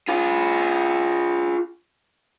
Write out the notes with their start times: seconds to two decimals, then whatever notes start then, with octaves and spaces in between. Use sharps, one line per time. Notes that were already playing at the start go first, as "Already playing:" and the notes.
0.09 F4 G#4